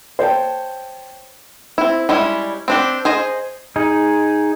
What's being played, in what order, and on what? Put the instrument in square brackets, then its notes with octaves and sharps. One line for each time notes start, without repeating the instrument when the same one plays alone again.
[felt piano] C5 C#5 G5 A5
[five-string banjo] C4 E4
G3 G#3 C#4 E4
C4 D4 G4
G#4 C5 D#5
[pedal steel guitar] D#4 G#4